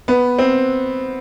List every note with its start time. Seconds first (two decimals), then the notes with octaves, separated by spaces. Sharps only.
0.08 B3
0.39 C4